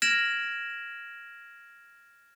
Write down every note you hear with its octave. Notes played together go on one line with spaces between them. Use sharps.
F6 G#6 A#6 D7 E7 F#7